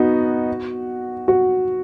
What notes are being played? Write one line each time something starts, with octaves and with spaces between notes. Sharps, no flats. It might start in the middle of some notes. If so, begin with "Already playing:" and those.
Already playing: B3 D#4 F#4
F#4